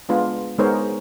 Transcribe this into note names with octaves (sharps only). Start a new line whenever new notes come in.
G#3 B3 D4 F4
G#3 B3 D#4 A#4 C5 C#5